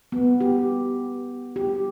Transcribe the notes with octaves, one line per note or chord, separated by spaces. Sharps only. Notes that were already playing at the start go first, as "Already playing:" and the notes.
B3
G4
G4